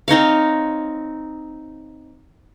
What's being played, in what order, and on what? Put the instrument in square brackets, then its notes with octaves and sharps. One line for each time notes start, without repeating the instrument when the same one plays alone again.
[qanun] C4 D#4 C#5 F5